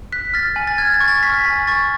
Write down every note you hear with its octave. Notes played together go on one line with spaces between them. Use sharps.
F#6 B6
F6 A6
G#5
A6
F6 G#6
A6
C#6
A6
F6 B6
G#5
C#6 A6